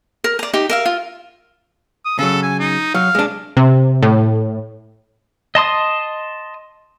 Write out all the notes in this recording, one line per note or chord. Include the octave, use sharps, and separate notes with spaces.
A#4
D5 A#5
D#4 G4
A#4 E5 F5
F4
D#6
C#3 F#3 A4
G#5
D#4
F#3 F5
G#3 D4
C3
A2
D#5 A5 C6 D#6